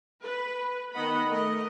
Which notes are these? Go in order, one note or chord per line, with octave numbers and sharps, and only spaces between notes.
B4
D#3 B3 D#5 F#5 B5
A3 A#4 D#5